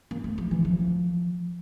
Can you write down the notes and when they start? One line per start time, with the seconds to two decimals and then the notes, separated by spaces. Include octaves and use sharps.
0.11 A#3
0.24 A3
0.38 F3
0.51 E3
0.65 F3